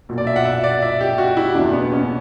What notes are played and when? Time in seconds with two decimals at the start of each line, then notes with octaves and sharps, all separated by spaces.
0.09 B1 A#2
0.18 D5
0.27 E5
0.36 F#5
0.45 E5
0.64 D5
0.82 E5
1.01 G4
1.18 F#4
1.37 E4
1.55 F#1 E2 B2 D4
1.73 B3
1.92 C#4